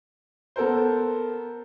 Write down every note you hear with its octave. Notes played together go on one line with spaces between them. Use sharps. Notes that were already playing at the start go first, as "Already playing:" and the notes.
B3 A4 A#4 C5